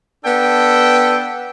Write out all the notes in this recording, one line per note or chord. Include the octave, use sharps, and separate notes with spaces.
B3 D4 A4 G5